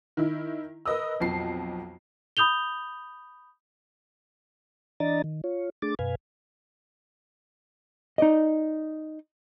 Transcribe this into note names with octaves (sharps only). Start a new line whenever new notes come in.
D#3 E4
A#4 B4 D#5 D#6 E6
B1 F2 A5 C7
B5 D#6 G6 F7 G7
E3 D4 D5 D#5 A#5 A6
D#3
F4 C#5
A3 D4 G#4 D6 A6
F#2 B2 B4 F5 G#5
D#4 D5 D#5